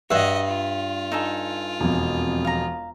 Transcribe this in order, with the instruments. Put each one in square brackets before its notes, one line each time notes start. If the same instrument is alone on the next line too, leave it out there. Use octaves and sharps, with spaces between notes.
[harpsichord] G2 [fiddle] F#4 D#5 [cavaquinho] E5 F#5
[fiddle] F4
[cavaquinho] D#4 A4 G#5
[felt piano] E1 F2
[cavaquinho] F5 A#5